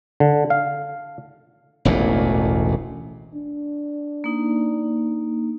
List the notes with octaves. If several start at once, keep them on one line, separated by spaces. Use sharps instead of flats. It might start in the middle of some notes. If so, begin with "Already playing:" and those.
D3
F5
E1 A1 D2 A#2
D4
A#3 D#4